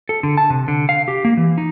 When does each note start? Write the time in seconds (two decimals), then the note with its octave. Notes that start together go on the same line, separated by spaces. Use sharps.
0.09 A4
0.23 D3
0.37 A5
0.50 C3
0.68 D3
0.89 F5
1.08 G4
1.25 A#3
1.37 E3
1.58 D#4